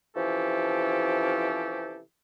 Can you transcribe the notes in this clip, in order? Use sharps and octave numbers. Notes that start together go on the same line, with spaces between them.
C3 E3 F3 C#4 G4 A4